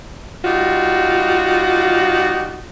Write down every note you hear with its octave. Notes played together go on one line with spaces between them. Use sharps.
G3 D#4 F4 F#4